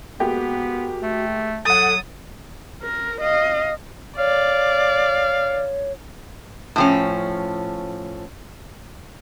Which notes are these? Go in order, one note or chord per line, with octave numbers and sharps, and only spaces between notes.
G#3 A#3 B3 F#4 G4
A3
F#3 A4 F#5 D#6 A6
A#4
D#5 F5
C#5 D5 F5
A2 F3 C#4